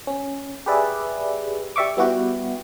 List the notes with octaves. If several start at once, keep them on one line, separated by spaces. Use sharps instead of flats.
C#4
G4 G#4 B4 D5 E5
G4 D5 E5 C#6 D6
G3 B3 E4 F#4 G4